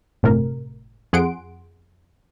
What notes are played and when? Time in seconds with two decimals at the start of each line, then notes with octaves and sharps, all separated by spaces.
0.23 G1 A2 C3 A3 A#4
1.13 F2 G#4 F#5 C6 D7